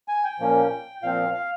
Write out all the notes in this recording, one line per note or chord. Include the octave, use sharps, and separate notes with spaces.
G#5
G5
A#2 F3 A#3 C#4
A#2 F3 C4 F5
F5